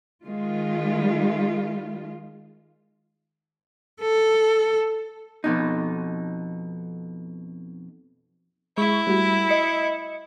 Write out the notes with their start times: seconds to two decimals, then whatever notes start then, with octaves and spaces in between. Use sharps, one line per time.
0.23 D#3 G#3 F4
4.01 A4
5.44 F2 B2 D#4
8.78 G#3 E4 C#6
9.07 G3 A3 F#4
9.49 D#5 C#7